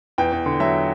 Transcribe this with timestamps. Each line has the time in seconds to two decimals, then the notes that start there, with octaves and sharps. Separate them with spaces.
0.18 E2 G5
0.32 E2
0.46 D3
0.60 F#3 E5